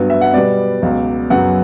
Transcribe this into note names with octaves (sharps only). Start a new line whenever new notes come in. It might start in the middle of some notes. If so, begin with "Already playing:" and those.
Already playing: G2 F#3 B3
E5
F#5
B2 G3 B3 D5
C#2 B2 F#3
F#2 C#3 F#3 B3 F#5